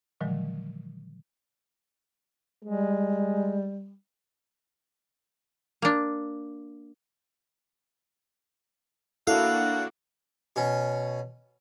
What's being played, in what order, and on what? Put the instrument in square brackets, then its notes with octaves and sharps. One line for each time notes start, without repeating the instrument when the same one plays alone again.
[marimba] A#2 D3 D#3 F3 F#3 G#3
[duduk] G3 [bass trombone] G#3
[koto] A#3 D4
[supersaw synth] A#3 D4 F#4 [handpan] E4 A4 [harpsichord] F5 [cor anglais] F#5
[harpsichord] B2 C#4